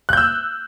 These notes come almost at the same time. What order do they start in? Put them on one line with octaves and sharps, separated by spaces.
F#6 G6 E6